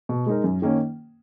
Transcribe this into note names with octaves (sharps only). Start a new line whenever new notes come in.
B2
G#3 D#4 A#4
F#2
D#3 A#3 C#4